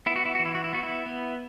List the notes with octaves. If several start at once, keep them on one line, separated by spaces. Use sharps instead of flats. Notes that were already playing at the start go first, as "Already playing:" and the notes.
B3 E4
F#4
E4
E3 F#4
E4
F#4
E4
B3 F#4
E4
B3